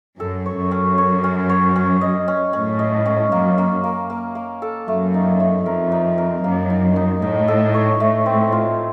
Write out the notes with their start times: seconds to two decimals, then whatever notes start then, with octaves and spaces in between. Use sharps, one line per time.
0.19 F#2 A4
0.46 C#5
0.58 F#2
0.71 C#4
0.98 C#5
1.24 C#4
1.49 C#5
1.76 C#4
2.01 D#5
2.28 C#4
2.53 A2 C#4
2.79 D#5
3.06 C#4
3.31 F#2 A#3
3.58 A#3
3.84 A#3
4.10 A#3
4.35 A#3
4.62 A4
4.87 F#2 A3
5.14 D#4
5.40 A3
5.65 F2 A#4
5.92 D#4
6.18 A#4
6.44 F#2 A#3
6.70 D#4
6.96 D#4
7.22 A2 D#4
7.48 A4
7.74 C#5
8.00 A2 A3
8.26 C4
8.52 F4